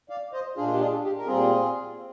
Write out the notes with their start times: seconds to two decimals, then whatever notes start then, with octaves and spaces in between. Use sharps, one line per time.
0.09 D5 F5
0.33 C5 D#5
0.56 A#2 G#3 D4 F4 G#4
0.73 G4
0.80 F4 G#4
1.04 G4
1.18 A#4
1.27 A#2 G3 C4 F4 G#4
1.97 C4